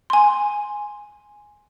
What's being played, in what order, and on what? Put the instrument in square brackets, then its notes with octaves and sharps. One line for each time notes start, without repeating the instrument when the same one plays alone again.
[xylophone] G#5 C6